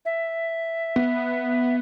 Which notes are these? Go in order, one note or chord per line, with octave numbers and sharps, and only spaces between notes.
E5
B3